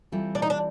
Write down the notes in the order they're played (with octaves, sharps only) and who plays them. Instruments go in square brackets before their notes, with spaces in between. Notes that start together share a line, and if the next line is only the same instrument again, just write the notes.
[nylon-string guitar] E3 G3 C4 F4 A4
[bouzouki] D4
D#4
D4